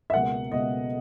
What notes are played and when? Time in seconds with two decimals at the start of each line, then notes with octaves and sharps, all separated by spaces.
0.10 E5
0.13 C#2 B2 A#3 F#5
0.52 C#2 B2 A#3 D#5